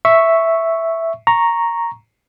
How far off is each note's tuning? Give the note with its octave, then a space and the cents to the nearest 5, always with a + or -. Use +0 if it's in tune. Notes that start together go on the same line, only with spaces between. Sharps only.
E5 +0 C#6 +0
A#5 +0 C#6 -5